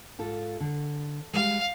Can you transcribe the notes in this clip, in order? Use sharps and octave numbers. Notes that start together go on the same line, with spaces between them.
G#2 F4 A4
D3
G3 G#3 F5